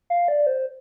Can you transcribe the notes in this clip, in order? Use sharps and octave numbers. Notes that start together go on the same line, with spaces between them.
F5
D5
C5